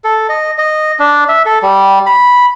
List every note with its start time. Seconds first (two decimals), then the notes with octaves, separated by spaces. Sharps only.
0.04 A4
0.29 D#5
0.58 D#5
0.99 D4
1.29 E5
1.46 A4
1.63 G3
2.06 B5